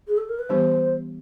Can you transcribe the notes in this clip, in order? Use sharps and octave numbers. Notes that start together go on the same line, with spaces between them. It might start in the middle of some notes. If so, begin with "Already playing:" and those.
G#4
A4
A#4
B4
E3 G3 B3 D4 G4 C5